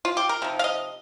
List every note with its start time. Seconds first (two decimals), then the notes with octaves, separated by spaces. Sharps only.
0.05 F4
0.17 G4
0.29 A#4
0.42 C3 F3 D#4
0.59 F5
0.64 D#5